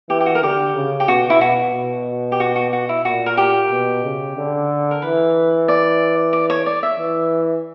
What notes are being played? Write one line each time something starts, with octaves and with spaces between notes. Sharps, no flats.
E3 G4
G4
F#4
A#4
D3 G4
C#3
G4
B2 F#4
E4
B2 F#4
B2
G4
F#4
F#4
F#4
E4
A#2 F#4
A#4
G4
B2
C#3
D3
A#4
E3 B4
D5
D5
C#5
D5
E5
E3